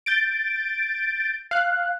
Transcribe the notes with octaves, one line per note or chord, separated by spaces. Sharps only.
G6 A6 D7
F5 F#6